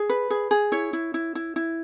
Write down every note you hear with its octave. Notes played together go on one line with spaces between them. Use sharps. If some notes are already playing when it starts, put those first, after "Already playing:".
Already playing: G#4
B4
G#4
G#4
E4 C#5
E4
E4
E4
E4